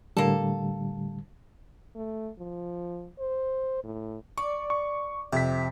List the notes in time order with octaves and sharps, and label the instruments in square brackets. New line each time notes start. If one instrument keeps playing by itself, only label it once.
[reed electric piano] A2 D3 G3 [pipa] A#3 A4
[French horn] A3
F3
C5
A2
[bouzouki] D5 [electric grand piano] C#6
[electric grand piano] C#6
[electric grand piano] F2 B6 [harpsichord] C3